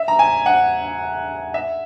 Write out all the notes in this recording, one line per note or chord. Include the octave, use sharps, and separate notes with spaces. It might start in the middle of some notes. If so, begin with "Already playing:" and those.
Already playing: E5
A#5
G#5
F#5
E5